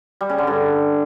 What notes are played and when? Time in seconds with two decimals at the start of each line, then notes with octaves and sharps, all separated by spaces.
0.21 G3
0.29 C#3
0.38 D3
0.47 G2